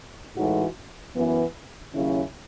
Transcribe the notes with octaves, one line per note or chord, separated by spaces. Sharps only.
A2 E3 G#3 D#4 F#4
F#2 E3 B3
D#2 C#3 F#3 C#4 E4